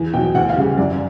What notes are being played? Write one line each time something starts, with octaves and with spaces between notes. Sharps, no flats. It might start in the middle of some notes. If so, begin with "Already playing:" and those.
Already playing: E2
B2 F#3 G5
D2 F#5
F5
C#3 E3 G3
F#2 D5